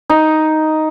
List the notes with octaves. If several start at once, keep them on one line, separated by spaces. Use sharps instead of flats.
D#4